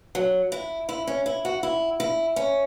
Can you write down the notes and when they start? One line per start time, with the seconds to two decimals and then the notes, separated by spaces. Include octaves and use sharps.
0.15 F#3
0.52 E4
0.89 E4
1.07 C#4
1.26 E4
1.45 F#4
1.63 E4
2.00 E4
2.36 C#4